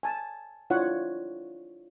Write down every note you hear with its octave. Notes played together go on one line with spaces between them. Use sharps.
G#5 A5
D4 E4 F4 C#5 F#5